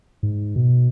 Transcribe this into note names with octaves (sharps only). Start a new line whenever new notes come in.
G#2
B2